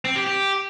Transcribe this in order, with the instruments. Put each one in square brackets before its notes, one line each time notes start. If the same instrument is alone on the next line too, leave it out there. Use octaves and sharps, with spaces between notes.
[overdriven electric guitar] C4
G4
G4